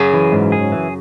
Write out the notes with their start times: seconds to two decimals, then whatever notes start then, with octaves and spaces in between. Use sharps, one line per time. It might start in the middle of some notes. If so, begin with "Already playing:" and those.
Already playing: F#2 C#3 F#3 G#4
0.14 E3
0.32 G#2
0.52 G#4
0.72 E3